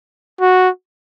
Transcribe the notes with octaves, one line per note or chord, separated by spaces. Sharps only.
F#4